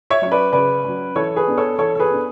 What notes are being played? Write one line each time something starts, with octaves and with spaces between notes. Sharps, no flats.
C#5 E5
F#3 C#4 C#5
B4 D5
C#3 B4 D5
F#3 C#4
E3 A4 C#5
G#4 B4
B3 D4
A4 C#5
E3 A4 C#5
A4
G#4 B4
B3 D4